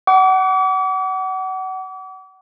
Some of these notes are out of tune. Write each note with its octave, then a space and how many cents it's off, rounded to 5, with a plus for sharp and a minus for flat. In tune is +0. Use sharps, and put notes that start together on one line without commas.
F#5 +30 D6 -40